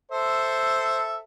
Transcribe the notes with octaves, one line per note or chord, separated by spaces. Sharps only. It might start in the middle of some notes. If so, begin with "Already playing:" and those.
A4 C5 E5